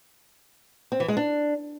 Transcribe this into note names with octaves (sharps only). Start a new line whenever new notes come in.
C4
E3
G#3
D4